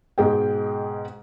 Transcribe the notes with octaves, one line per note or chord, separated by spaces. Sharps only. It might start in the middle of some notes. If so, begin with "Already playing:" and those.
G#2 B2 G#3 G#4 G5